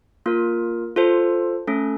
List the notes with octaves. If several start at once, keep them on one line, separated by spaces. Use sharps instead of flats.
A#3 F4 A#4
F4 A4 C5
A3 C#4 A4